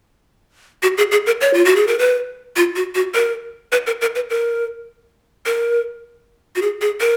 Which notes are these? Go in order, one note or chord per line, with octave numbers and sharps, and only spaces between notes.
F#4
G#4
G#4
A#4
C#5
F4
F#4
G#4
A#4
B4
F4
F#4
F#4
A#4
B4
A#4
A#4
B4
A#4
A#4
F#4
G#4
G#4
A#4